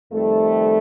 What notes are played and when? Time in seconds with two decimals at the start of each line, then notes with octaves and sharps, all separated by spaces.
0.12 F2 D#3 G3 A3